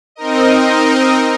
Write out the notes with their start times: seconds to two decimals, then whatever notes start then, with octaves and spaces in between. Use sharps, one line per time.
0.16 C4 D#4 A#4 D#5